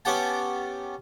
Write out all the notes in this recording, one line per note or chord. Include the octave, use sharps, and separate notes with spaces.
B3 C#4 G4 F#5 G5 A5